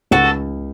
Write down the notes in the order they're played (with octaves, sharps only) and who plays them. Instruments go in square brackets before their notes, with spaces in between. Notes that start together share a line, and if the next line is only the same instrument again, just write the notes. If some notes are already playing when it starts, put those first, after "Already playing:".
[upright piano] C#2 [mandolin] F#4 A4